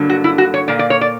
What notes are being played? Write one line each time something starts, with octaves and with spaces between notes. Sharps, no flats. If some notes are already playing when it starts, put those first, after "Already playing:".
Already playing: G2 D3 F#3 A#3
F#4
E4
F#4
C#5
A#2 A#3 D5
D5
C#5
D5